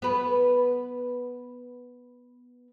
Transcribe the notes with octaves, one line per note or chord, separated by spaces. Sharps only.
B3 B4